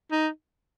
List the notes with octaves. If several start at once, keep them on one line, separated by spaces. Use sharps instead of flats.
D#4